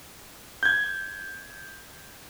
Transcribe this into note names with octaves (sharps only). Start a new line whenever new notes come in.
G6 G#6